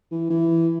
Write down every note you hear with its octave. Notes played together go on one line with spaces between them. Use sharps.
E3
E3